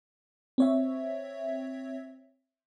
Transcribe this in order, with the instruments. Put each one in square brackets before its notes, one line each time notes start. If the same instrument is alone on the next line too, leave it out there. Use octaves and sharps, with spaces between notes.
[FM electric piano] C4 C#5 E5